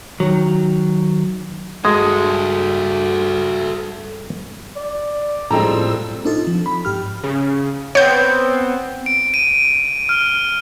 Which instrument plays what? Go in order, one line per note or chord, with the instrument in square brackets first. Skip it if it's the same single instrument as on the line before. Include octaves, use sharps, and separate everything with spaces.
[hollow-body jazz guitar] D#3 F#3
[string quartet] G2 [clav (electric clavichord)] G#3 [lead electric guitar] F#4 A4
[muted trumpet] D5
[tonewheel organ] A2 E6 [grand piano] F3 G3 C4 [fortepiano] G#3 A4 A#5
[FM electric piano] C4 D4 D#4 F4 A4
F3
B5
G#2 G4 F6
[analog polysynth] C#3
[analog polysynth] B3 C4 [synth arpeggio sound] C#5 G6
[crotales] D7
D#7
F6